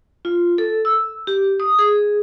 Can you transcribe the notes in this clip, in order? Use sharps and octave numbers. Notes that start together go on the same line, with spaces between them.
F4
A4
E6
G4
D#6
G#4